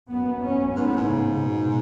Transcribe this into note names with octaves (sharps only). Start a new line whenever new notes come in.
F#2 B3
C#4
G#2 B3
A2
G#2
C#3
B2